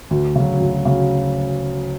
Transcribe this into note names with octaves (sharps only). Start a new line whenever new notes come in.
D2
C#3 F#3
D2
C#3 F#3